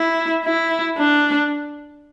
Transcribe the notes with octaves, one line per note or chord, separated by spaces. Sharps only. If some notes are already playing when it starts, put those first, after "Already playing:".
Already playing: E4
E4
D4